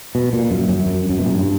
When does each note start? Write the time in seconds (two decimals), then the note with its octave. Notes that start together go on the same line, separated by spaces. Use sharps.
0.15 B2
0.33 A#2
0.51 F#2
0.68 F#2
0.86 F#2
1.09 F#2
1.19 B2
1.25 A#2
1.33 G2